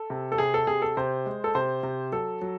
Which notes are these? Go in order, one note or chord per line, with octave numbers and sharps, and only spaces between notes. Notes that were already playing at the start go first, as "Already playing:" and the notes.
Already playing: A4
C3
A4
C3 G#4
A4
C3 G#4
A4
C3 C5
G#3
A4
C3 C5
C3
F#3 A4
F#3